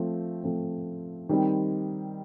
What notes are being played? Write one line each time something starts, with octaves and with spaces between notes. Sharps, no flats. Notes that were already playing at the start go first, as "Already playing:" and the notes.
Already playing: F3 A3 C4
F3 A3 C4
D#3 G3 C4